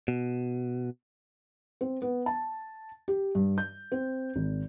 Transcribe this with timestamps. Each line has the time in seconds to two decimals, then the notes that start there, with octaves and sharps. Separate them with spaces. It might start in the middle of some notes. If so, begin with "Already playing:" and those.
0.08 B2
1.81 C4
2.02 B3
2.26 A5
3.08 G4
3.35 G2
3.58 G6
3.92 C4
4.36 G#1